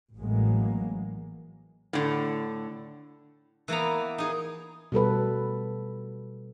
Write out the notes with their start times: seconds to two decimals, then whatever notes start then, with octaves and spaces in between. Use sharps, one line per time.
0.16 A1 A2 E3 F#3 G#3 A#3
1.93 A2 D3
3.68 E3 A#3 B3 A#5
4.18 D#4 G#4
4.92 B2 G3 A4 B4